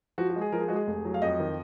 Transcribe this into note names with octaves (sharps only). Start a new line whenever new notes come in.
F3 F#4
F#4
G#3
G#4
F3 A#4
G#4
G#3 F#4
G#4
F1
F#3
F5
F2 D#5
D#3